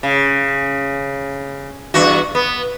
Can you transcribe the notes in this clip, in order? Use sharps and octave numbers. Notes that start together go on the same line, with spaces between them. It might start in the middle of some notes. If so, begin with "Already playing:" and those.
C#3
E2 G2 F#4
B3